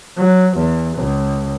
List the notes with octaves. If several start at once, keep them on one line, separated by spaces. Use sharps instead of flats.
F#3
E2
C#2